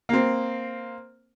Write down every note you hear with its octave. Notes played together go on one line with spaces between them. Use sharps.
A#3 C4